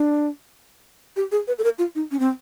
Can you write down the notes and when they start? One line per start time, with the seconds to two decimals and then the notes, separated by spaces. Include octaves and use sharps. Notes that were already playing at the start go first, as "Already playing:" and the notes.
Already playing: D4
1.16 G4
1.32 G#4
1.47 B4
1.58 A4
1.64 A#4
1.79 F4
1.95 D#4
2.11 C#4
2.19 C4